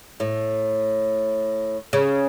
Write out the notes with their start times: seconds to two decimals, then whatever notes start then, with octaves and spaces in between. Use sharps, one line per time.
0.20 A2
1.93 C#3